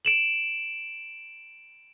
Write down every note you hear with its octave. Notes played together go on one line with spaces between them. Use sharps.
D7 E7 F#7